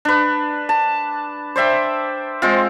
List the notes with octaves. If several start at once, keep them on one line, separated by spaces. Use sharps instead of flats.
D4 B4
A5
C5 D5 E5 G5
G#3 C4 F4